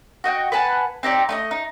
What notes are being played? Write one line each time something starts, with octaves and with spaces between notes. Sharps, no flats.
F#4 D#5 F#5 G5
B4 F#5 G#5 A5
C4 D#4 G4 D5
A3 D5 D#5
D#4